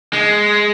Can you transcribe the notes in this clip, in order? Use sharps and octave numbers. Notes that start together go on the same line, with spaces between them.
G#3